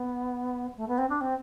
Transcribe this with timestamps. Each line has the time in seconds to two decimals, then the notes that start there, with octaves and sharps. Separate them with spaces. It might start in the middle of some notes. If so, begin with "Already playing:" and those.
Already playing: B3
0.77 A3
0.88 B3
0.98 C4
1.09 D4
1.21 C4